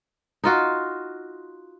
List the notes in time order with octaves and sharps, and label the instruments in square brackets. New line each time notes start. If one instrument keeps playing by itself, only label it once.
[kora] D#4 F4 F#4